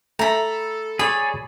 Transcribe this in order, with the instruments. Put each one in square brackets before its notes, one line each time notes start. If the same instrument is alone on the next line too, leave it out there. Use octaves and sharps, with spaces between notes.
[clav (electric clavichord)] A3 [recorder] A4 [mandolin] A#5 B5
[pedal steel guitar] G#4 C#5 D5 [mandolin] B5